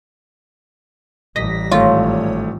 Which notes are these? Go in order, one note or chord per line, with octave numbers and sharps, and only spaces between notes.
A1 G3 D#5 A#6 B6
G#1 A3 F4 C#5